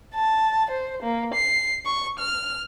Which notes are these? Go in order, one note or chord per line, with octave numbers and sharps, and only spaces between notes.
A5
C5
A#3
C7
C#6
F6